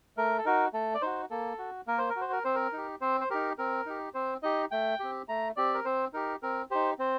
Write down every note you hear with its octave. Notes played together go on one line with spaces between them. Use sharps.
A3 A#4
A4
D#4 F#4 A#4
A3 A4
D5
D#4 F#4 C5
A#3 A4
F#4
A#3 A#4
C5
A#4
F#4 C5
A#4
C4 C5
A#4
D#4 G4
C4 C5
C5
D#4 G4 A#4
C4 A#4
D#4 G4
C4 C5
D#4 G4 D#5
A3 G5
C4 G4
A3 A#5
C4 G4 D5
A#4
C4 C5
D#4 G4 A#4
C4 A#4
D#4 G4 C5
C4 C5